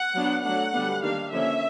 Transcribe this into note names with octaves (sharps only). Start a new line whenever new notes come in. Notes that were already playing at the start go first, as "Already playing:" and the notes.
Already playing: F#5
F#3 B3 D4
F#3 A3 D4 F#5
D3 G3 B3 D4
D#3 G3 A#3 D4 F5
D3 F3 A#3 C#4 E5